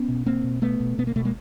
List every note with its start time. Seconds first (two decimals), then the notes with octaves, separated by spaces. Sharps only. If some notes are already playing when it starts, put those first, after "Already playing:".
Already playing: B3 C#4
0.08 B2
0.25 B2 A#3 C4
0.44 B2
0.62 B2 A3 B3
0.80 B2
0.98 B2 B3
1.07 A#3
1.16 B2 A3
1.25 G#3 A#3